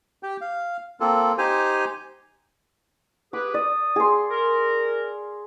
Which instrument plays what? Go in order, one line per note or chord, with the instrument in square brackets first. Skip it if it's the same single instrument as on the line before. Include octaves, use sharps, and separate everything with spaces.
[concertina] G4 G5
F5
A#3 C4 F4 A4
D#4 G4 C5 G#5
[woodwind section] G4 G#4 B4 [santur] D6
[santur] D5 [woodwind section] D#6
[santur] G#4 C6
[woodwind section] A#4